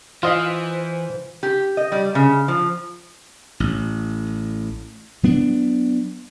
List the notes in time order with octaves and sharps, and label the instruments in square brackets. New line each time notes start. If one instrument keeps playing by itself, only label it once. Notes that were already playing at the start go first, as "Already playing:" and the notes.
[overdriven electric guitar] E3 [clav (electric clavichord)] F4 D#5 F5 [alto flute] C5
[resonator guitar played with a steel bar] G4
D#5
G3
C#3
F3
[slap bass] A1
F#3 B3 D4